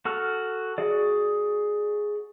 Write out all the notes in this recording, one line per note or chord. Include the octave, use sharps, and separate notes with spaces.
F#4 A4 F6
F#4 G#4 D5